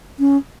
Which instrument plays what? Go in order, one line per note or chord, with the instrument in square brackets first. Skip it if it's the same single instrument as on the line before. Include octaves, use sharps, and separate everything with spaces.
[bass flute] C#4